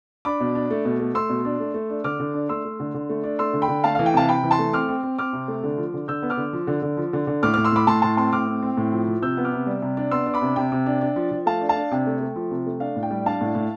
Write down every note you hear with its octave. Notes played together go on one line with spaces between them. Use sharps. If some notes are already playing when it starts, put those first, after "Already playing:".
D4 B5 D6
B2
D4
A3
B2
A3
A3 C6 E6
B2
D4
A3
A3
D4
D3 D6 F6
D3
D4
A3 C6 E6
A3
D3
D3
A3
D4
A3 C6 E6
D3
G5 B5
D3
A3 F5 A5
E3 F5
G5
C3 F5 A5
C3 G5 B5
E3
A5 C6
A3
C4 D6 F6
C4
C4
C4 D6 F6
C3
A3
D3
F3
D3
D3 E6 G6
B3
D6 F6
D3
F3
D3
D3
F3
D3
D3
A2 D6 F6
A2 D6 F6
C6 E6
A2 B5 D6
A2 A5 C6
A2 A5 C6
C4 A5 C6
A2 D6 F6
C4
C4
A2
F3
F3
C3 E6 G6
B3
D6 F6
C3
G3
C3
D4
B3 C6 E6
D4
B5 D6
C3
C3 G5
C3
D4
D4
F3
F3
A3 F5 A5
D4
F5 A5
D4
C3 G5
A3
A3
F3
C3
A3
D4 F5
A2
G5
G3
D4 F5 A5
A2
A2